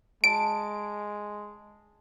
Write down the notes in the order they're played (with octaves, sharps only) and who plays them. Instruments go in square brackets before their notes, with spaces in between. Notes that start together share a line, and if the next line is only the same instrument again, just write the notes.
[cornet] G#3 [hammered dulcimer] A5 [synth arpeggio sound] D7